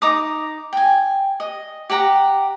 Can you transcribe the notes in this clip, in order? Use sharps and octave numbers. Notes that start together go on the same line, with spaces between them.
D#4 A#5 D6 D#6
G5 G#5
D#5
G4 F#5 G5 A#5